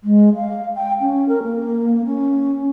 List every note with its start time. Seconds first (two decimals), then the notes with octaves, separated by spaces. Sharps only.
0.04 G#3
0.36 F5
0.75 G5
1.01 C#4
1.29 A#4
1.43 A#3
2.05 C#4